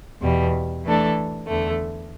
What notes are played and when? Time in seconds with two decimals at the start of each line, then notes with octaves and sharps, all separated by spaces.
0.21 E2 B2 G3
0.85 E3 A3 D4 A4
1.47 E2 D3 A3